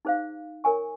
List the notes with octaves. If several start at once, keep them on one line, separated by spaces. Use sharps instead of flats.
D#4 G#4 C5 F5
A#4 C#5 G#5 C#6